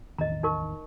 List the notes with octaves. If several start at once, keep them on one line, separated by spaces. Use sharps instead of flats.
A1 E2 D#3 D#5 A#5
D#4 A#4 C#6